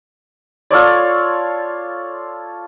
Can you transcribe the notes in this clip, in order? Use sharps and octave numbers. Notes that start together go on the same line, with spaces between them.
F4 A4 C#5 D5